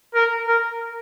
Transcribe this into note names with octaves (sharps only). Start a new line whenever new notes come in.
A#4
A#4